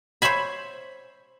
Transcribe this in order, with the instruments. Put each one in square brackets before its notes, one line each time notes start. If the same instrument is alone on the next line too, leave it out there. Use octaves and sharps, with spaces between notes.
[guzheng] C5 C#5 E5 G#5 B5